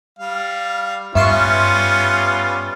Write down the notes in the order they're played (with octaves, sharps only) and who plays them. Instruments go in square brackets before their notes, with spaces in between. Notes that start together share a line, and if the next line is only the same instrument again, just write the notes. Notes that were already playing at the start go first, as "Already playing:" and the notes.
[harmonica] G3 F5
[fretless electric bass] G2 [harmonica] G3 B3 C#4 [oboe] F4 [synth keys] E5 C6 C#6